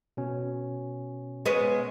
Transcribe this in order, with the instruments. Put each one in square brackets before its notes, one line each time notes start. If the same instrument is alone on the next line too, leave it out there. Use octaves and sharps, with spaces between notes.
[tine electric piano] B2 C#4
[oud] G#3 B3 C#4